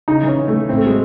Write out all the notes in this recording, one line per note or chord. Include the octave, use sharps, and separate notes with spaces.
C#3 D#4
E3 C#4
C#3
A3
E3
A2 C4
A3
F#3 G#3